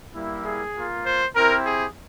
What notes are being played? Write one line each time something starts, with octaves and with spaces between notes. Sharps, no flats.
G3 A#3 E4
G#4
A#3 F4
C5
C4 E4 G4 A#4
G#4